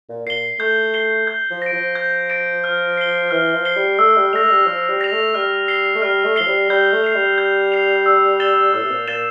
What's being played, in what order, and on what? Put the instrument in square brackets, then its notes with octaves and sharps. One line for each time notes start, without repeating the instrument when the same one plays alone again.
[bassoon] A#2
[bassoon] A#2 [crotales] C7 G7
[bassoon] A3 [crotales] G6
[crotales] C7 G7
G6
[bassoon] F3
[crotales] A#6 D7
[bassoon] F3
[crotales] G6
A#6 D7
F6
C7 G7
[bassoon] E3 [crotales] F6
[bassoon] F3
[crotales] C7 G7
[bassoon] G3
[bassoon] A3 [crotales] E6
[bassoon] G3
[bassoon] A3 [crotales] A#6 F7
[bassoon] A3
G3
[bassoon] F3 [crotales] E6
[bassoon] G3
[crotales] A#6 F7
[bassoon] A3
[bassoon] G3 [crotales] F6
[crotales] C7 G7
[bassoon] A3
[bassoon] G3 [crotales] F6
[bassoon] A3
[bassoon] F3 [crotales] C7 G7
[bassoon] G3
[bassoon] G3 [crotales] G6
[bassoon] A3
[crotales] C7 F7
[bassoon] G3
[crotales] G6
C7 F7
E6
A6 E7 G7
[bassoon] A2 [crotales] E6
[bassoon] C3
A#2
[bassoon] A#2 [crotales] A6 E7 G7